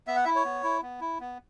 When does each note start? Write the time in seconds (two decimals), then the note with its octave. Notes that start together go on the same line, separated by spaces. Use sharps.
0.07 B3 E5
0.16 F#5
0.25 E4 E5
0.35 C#5
0.45 B3
0.63 E4
0.83 B3
1.01 E4
1.20 B3